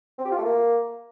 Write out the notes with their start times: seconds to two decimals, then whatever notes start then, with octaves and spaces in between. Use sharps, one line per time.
0.18 C4
0.25 G4
0.31 F4
0.38 A3
0.44 A#3